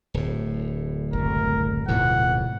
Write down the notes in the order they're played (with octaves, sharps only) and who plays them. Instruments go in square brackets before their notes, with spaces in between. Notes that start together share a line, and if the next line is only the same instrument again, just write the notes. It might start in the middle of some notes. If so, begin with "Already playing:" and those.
[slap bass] D1 A2
[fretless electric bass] F#1 C2 A3 [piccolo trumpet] A#4
[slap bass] D1 F2 [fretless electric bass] G#2 B2 E3 [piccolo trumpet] F#5